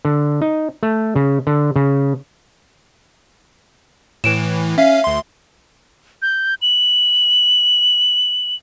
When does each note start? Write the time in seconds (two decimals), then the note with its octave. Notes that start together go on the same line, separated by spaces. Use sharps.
0.05 D3
0.42 D#4
0.83 A3
1.16 C#3
1.47 D3
1.76 C#3
4.24 A2 E3 D7 E7
4.78 C#4 E5 F5
5.04 D2 C6
6.22 G6
6.62 F#7